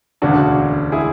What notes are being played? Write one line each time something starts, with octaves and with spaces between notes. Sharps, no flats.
E1 D2 C#3 D4 F#4
E4 G#4